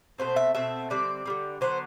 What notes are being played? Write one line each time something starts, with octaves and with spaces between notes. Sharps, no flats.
B2 A3 C4 C5
E5
B2 A3 C4 E5
D3 G3 C4 D5
D3 G3 C4
D3 F#3 B3 C5